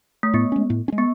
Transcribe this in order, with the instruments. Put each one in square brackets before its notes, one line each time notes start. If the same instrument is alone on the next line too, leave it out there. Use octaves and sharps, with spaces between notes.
[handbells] A3
[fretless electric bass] A2 [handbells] B3
[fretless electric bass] G#3 C#4
A2
C#4
G#3
[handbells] B3